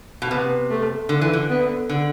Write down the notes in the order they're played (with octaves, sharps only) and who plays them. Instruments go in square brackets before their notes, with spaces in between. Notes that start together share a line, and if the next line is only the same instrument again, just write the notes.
[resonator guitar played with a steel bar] B2
[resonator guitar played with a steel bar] C3 [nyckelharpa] B3
[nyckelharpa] A3
[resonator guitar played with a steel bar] D3
E3
D3
[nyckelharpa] B3
[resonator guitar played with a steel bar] D3